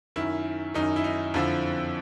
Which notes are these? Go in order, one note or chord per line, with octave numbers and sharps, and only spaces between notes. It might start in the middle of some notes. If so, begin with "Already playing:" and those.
F#2 D#3 E4
F#2 D#3 D#4
E4
D#4
F2 D3 F3 E4